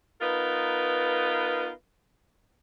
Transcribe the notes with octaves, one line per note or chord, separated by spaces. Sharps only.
B3 D#4 F4 A#4 B4